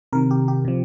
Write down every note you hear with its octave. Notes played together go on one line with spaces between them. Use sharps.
C3 D#3 A#4
G4
G4
C3 F3